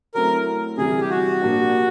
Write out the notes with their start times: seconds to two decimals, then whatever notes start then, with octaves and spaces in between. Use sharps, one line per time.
0.15 F#3 A3 C4 E4 A#4
0.78 C3 E3 G3 G#4
1.01 G4
1.10 F#4
1.41 A#2 F3 A#3 D4 G4